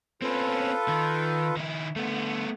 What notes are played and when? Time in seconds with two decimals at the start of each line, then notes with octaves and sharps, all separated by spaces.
0.22 C4 C#4 F4 A4 B4
0.88 D#3
1.57 D#3 E4
1.96 D3 A3 B3